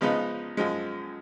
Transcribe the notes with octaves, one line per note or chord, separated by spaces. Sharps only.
C#3 F3 G#3 B3 D#4
F#2 F3 G#3